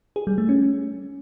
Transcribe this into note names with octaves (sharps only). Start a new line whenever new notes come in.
G#4
G3
A3
C#4